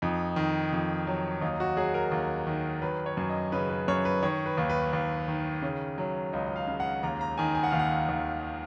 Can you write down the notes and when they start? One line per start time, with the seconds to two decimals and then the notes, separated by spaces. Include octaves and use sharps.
0.02 F2 D#4
0.36 D#3
0.73 F2
1.07 F#3
1.41 D#2 D#4
1.60 F#4
1.76 F#3 G#4
1.94 A#4
2.12 D#2
2.47 D#3
2.82 F#3 B4
3.06 C#5
3.17 F#2
3.30 D#5
3.52 C#3 B4
3.70 B4
3.88 F#2 C#5
4.05 B4
4.23 D#3 C#5
4.46 B4
4.57 D#2
4.70 B4
4.93 D#2
5.28 D#3
5.62 C#3
5.98 F#3
6.33 C#2 D#5
6.46 D#5
6.56 F5
6.67 C#3
6.80 F#5
7.03 D#2 A#5
7.21 A#5
7.38 D#3 G#5
7.55 G#5
7.63 F#5
7.71 D#2 F5
7.79 F#5
8.09 D#2